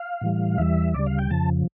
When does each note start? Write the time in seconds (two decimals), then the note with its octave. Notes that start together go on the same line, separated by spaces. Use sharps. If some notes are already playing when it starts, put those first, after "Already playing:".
Already playing: F5
0.21 A2 E3 G3
0.58 E2 E3 G3 E5
0.94 D2 C#3 G3 D5
1.06 F5
1.19 G5
1.30 F2 C#3 F3 A5